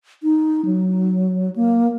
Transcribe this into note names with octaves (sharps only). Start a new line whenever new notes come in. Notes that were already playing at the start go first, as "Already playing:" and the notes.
D#4
F#3
A#3